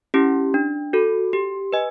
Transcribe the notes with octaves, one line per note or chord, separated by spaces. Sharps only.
C#4 E4 G4
D4
F#4 A4
G4
B4 D#5 G#5